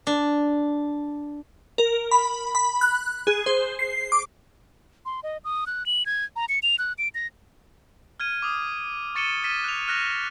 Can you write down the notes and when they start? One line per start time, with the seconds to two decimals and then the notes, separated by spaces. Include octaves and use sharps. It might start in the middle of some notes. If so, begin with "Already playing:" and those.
0.07 D4
1.78 A#4
2.11 B5
2.55 B5
2.81 F#6
3.27 G#4
3.46 C5
3.79 C7
4.12 D6
5.05 C6
5.23 D#5
5.44 D#6
5.67 F#6
5.86 F#7
6.06 G#6
6.36 A#5
6.49 C#7
6.63 F7
6.79 F#6
6.98 D7
7.15 A#6
8.20 F6 G#6 D#7
8.42 D6 D#6
9.15 C#6 A6 C#7 D#7 E7 G7
9.44 F6 A6 B6 D#7 E7
9.64 F#6 F7
9.88 F6 F#6 A#6 D#7 F7